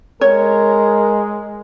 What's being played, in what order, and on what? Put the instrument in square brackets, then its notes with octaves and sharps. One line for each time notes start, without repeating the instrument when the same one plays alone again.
[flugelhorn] G#3 [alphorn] A#4 [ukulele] C#5